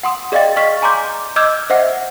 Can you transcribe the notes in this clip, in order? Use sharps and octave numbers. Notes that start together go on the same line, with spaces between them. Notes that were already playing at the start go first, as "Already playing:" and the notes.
F#5 C6 D#6
G#4 D5 D#5 F5 G5 A6
D#5 C#6 F6 B6
G#5 A#5 C6 D6 G6
D#5 D6 E6 F6 G6 G#6
C5 D#5 E5 F#5